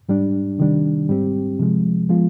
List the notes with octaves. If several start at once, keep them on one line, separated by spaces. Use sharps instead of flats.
G#2 G3 D4
C3 D#3 G3 D4
G#2 G3 C4 G4
C3 F3 G#3
F3 G#3 B3 F4